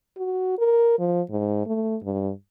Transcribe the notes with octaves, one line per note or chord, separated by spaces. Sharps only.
F#4
A#4
F3
G#2
A3
G2